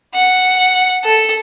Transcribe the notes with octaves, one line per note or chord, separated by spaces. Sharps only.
F#5
A4